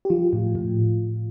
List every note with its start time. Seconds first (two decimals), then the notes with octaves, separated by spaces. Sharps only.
0.05 G4
0.10 F3 F4
0.33 A2
0.55 A2